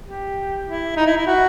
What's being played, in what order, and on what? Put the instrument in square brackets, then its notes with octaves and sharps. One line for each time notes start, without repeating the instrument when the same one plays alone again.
[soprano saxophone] G4
E4
D#4
E4
E4
F#4